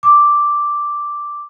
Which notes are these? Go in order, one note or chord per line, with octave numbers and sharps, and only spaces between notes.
D6